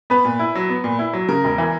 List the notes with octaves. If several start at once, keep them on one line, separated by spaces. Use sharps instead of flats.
B3 B4
A#2
E4
F#3
B3
A#2
E4
F#3
C#3 A#4
E1
E3